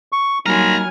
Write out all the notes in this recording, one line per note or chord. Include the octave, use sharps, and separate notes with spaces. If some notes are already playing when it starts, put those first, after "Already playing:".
C#6
F#3 G3 A#3 D#4 G#5 A#5 B5 F6